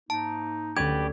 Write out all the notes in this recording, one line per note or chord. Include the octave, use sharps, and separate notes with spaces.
G#2 A#3 D#4 A5
D2 C#4 G4 B4 C#5 D5 G#6